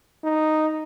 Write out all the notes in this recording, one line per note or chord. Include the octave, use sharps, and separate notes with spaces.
D#4